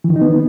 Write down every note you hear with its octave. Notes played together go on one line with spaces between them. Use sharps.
E3
D#3
D#4
B3